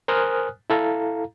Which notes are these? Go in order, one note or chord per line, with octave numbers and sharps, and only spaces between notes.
A#4 C5 G#5 D#6 F6 F#6
E4 A4 F5 A#5